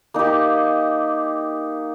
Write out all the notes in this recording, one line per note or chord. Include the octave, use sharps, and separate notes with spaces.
A#3 D#4 G4